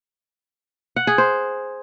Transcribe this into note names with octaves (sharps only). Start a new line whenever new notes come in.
F#5
G#4
C5